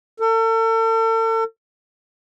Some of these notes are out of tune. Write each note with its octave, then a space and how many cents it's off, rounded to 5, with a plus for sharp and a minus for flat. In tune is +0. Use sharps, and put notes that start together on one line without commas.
A4 +40